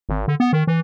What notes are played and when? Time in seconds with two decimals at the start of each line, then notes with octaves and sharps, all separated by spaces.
0.09 G#1
0.28 D3
0.40 B3
0.53 D#3
0.67 E3